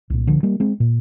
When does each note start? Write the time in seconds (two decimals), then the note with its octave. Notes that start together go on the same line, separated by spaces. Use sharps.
0.10 C2 A#2
0.27 D3 F3
0.43 G3 A#3
0.60 G#3 C4
0.80 A#2